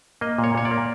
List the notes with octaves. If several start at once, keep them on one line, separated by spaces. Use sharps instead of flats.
A#3 D#5
A#2
C#5
A#2 C#5
D5
A#3